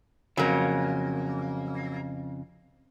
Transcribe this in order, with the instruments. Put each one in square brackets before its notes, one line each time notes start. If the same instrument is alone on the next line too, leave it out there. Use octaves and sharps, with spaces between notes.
[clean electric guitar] F2 C#3 [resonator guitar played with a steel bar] F#3 A#3